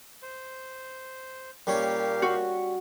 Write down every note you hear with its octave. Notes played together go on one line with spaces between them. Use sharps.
C5
A#2 G3 A#3 C#4 G4 C#5 F5
F#4